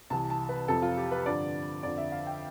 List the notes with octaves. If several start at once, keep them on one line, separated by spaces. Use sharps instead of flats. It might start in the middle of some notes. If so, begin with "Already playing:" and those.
C2 C3 E3 A5
A5
B4
F2 C3 F3 A4
F4
G4
B4
G2 D3 F3 D5
F2 D3 F3 D5
E5
F5
G5